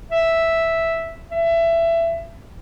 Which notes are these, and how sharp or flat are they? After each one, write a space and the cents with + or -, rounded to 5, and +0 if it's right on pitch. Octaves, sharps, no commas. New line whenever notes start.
E5 +0
E5 +20